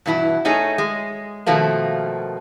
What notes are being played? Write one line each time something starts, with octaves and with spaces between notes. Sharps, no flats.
G2 B2 E3 E4
A3 C#4 D#4 G#4
G#3
B2 D#3 F3 A3 A#3